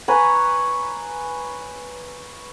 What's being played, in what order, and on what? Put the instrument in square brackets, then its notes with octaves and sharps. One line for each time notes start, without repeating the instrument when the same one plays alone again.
[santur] B4 C#5 G#5 A#5